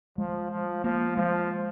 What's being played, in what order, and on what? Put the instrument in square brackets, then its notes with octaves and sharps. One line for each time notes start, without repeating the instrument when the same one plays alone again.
[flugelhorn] F3 [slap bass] G#3
[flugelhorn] F3
[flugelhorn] F3 [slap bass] A#3
[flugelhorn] F3 [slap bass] G#3